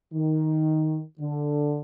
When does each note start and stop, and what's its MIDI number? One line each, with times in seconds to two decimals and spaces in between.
0.14 1.01 51
1.20 1.81 50